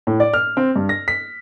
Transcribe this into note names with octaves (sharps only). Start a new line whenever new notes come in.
A2
D5
F6
C4
G2
A#6
B6